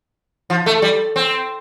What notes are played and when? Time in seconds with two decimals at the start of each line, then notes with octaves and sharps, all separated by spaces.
0.50 F3
0.66 A3
0.82 G3
1.16 C4